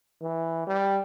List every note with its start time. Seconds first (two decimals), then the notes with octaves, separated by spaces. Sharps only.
0.22 E3
0.67 G3